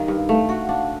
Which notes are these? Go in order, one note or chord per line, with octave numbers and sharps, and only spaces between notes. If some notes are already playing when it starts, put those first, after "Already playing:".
Already playing: D#3 G3 F5
G2
A3 F5
F#4 F#5
D4 F5